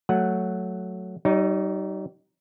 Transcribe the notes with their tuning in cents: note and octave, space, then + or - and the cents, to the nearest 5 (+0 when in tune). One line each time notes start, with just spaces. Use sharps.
F#3 +0 A3 +0 F#5 +0
G3 -40 D#4 +0 C#5 +15